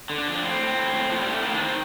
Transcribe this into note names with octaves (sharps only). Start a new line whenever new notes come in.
D3
D4
F2
A2 C4
A2
A2
A2
A2 F3
G3
A2 A3
D#3 A#3
D4
D#3 C4